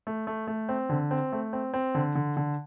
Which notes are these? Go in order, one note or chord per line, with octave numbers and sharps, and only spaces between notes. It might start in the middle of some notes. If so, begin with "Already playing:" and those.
A3
A3
A3
C4
D3
C4
A3
C4
C4
D3
D3
D3